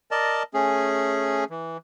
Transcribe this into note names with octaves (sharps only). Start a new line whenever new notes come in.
A#4 D5 D#5 A5
A3 C#4 G#4
E3